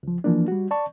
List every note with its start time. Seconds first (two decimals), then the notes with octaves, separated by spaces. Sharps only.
0.03 C#2 F3
0.24 E3 F3 A#3 D4
0.48 G3 F#4
0.71 D5 A5 C#6